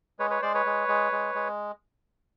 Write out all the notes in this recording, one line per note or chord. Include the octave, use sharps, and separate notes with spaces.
G#3 B4 C#5
B4 C#5
G#3 C5 D5
B4 C#5
G#3
G#3
G#3
G#3